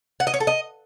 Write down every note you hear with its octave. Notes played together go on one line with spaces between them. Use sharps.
F#5
D#5
C#5
A4
D#5